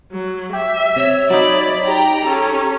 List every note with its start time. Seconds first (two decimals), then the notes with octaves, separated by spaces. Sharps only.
0.12 F#3
0.53 G4 E5
0.96 C3 C#5 E6
1.30 F#3 D#4 D5 B5
1.86 G4 G5 A#5
2.25 C#4 G4 A4 A#5